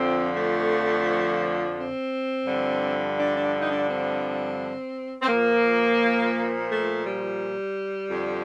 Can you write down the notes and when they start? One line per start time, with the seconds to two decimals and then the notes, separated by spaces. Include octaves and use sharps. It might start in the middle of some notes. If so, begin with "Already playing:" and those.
Already playing: F2 D3 F3 C4
0.35 A3
1.77 C4
2.46 G2 D3 F3
3.17 D4
3.35 D4
3.59 D#4
3.70 D4
3.87 C4
5.22 C4
5.28 A#2 F3 A#3
6.69 A3
7.04 G3
8.10 F2 D3 F3